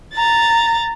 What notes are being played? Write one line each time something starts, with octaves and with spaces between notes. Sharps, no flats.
A#5 A6